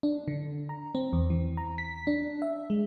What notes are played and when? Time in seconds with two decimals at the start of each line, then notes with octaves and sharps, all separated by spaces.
0.03 D4
0.28 D3
0.69 A#5
0.95 C4
1.13 E2
1.30 E3
1.57 A#5
1.78 B6
2.07 D4
2.42 E5
2.70 G#3